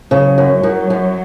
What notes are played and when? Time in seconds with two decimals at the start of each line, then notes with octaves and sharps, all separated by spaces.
0.11 C#3 F#3
0.38 F#2
0.63 F#2
0.90 F#2